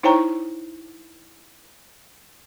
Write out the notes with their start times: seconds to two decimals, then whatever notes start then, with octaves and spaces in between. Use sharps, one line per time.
0.03 D#4 E4 C5 C#5 G5 A#5